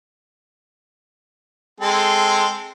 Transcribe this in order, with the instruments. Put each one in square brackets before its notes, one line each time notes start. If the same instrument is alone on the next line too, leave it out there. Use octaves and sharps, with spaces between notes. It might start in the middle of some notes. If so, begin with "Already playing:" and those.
[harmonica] G#3 C4 A4